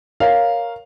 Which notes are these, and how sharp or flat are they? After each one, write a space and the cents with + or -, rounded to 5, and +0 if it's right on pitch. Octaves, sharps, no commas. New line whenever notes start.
A#4 +0 C#5 +0 F5 +0